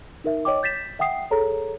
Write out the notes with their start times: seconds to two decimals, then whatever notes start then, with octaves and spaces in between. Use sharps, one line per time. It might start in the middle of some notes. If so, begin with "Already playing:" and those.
0.24 D#4 A#4 E5
0.45 C#5 D#5 G5 D6
0.63 G6 A6 B6 E7
0.99 E5 F#5 G5 D#6 C7
1.31 G#4 A4 C#5 A#5